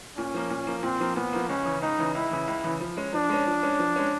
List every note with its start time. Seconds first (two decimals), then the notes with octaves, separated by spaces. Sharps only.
0.17 A#2 C#4
0.34 F3 A#3
0.50 A#2
0.67 F3 A#3
0.83 A#2 C4
1.00 F3 A#3
1.16 A#2 B3
1.33 F3 A#3
1.49 C#2 C#4
1.65 C#3 E3
1.82 C#2 D#4
1.99 C#3 E3
2.15 C#2 E4
2.31 C#3 E3
2.47 C#2
2.64 C#3 E3
2.80 F3
2.97 G#3 C#4
3.13 F3 D4
3.29 G#3 C#4
3.47 F3
3.63 G#3 C#4
3.79 F3
3.96 G#3 C#4